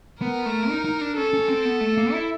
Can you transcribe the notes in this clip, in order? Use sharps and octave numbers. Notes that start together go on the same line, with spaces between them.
B3 A#4
A3
D#4
D#4
D4
C#4 A4
C#4
C4
B3
A3
A#3
E4